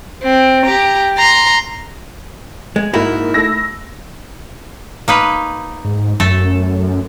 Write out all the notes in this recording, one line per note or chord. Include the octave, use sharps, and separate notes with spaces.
C4
G4 A#5
A#5 C6
G#3
G#2 A#3 D#4 E4 F#4
A3 E6 A#6
A#3 D#4 B4
G#2
F#2 A3 A4